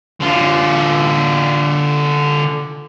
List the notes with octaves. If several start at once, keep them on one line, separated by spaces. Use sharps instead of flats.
D3 F4